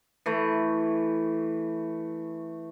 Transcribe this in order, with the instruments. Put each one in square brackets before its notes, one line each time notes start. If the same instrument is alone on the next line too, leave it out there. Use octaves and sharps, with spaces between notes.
[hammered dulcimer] E3 A3